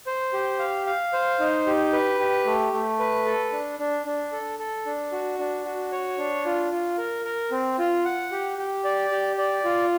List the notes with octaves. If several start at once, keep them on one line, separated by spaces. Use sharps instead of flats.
C5
G4
F5
F5
C5
D#4
G4
B4
G4
A3
A3
B4
A4
D4
D4
D4
A4
A4
D4
F#4
D4
F#4
C#5
D4
F4
F4
A#4
A#4
C4
F4
F#5
G4
G4
D5
G4
D5
F4